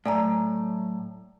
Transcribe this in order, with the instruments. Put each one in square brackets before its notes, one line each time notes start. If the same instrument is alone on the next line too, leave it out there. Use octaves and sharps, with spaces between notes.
[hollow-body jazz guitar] A2 [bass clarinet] F#3 [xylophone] D5 G#5 A#5